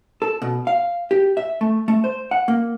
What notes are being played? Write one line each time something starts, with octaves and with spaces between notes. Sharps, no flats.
A4
B2
F5
G4
E5
A3
A3
C5
F#5
A#3